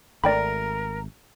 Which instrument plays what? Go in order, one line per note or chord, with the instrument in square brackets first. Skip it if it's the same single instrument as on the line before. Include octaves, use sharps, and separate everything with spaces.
[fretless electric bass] G#1 A3 [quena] A#4 [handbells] D5 G5 B5 [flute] A#5